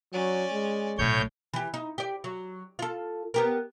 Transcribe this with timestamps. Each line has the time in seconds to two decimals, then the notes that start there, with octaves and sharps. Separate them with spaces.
0.13 F#3 C#4 D5
0.53 G#3
0.98 B1 A2 C3 C#5 G6
1.53 E3 G4
1.74 D#4
1.98 G4 D5
2.24 F#3
2.79 F4 A4
3.34 B3 G4 A#4